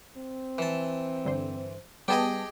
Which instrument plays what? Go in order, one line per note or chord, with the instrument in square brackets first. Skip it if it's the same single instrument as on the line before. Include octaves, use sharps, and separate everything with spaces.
[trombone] C4
[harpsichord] E3 A5
[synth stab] G2 D3 C5
[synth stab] G3 B3 A5 [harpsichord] G4 G#4 D#5